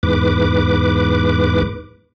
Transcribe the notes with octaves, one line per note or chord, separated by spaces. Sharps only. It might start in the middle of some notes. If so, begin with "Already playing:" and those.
E2 G#2 B4 D6